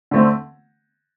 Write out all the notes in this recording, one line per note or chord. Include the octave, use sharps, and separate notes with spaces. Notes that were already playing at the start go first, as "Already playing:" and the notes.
D3 A3 C4